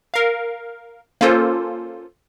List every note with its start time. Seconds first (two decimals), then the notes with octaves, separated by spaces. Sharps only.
0.14 A#4 F5
1.21 A#3 C#4 F4 A4 C5